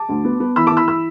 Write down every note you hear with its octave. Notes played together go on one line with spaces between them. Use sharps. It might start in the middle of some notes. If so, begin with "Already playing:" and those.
Already playing: A5 D6
D2
B3
B3
E3 B5 E6
A5 D6
E3
B5 E6
B5 E6